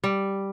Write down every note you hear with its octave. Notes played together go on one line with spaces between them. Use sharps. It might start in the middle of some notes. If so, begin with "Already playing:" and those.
G3